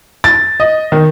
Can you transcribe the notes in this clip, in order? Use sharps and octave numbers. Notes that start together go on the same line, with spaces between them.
A6
D#5
D#3